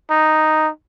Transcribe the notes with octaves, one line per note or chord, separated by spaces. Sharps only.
D#4